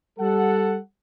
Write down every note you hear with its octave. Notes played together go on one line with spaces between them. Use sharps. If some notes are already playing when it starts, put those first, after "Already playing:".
G3 A4 F#5